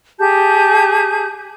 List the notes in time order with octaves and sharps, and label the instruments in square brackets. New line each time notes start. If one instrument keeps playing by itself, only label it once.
[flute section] G4 G#4 A5 G6